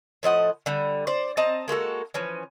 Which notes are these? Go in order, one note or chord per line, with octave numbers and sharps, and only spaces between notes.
A2 F3 D#5 F#5
D3 G3
C5 D5
C4 D#5 A5 A#5
G#3 A#3 F#4 A4
E3 F3 C#4